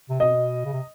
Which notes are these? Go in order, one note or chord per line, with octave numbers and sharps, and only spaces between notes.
C3
B2 D#5
C#3
C3